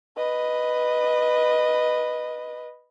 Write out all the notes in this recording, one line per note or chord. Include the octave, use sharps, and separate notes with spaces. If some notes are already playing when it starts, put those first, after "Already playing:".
B4 D#5